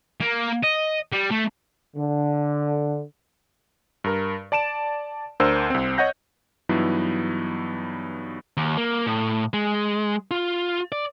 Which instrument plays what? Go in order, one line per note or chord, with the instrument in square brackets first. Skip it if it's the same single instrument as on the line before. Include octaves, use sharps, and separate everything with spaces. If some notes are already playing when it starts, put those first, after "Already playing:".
[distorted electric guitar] A#3
D#5
G3
A3
[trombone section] D3
[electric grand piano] G2 A#4
D5 A5 D7 E7
D2 D4 A#4 C5 E6
C2 C4
C#5 D#5 F#5 G6 A#6
G2 E3 F#3 B3 D#4 E4
[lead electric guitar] D#2
A#3
A2
G#3
F4
D5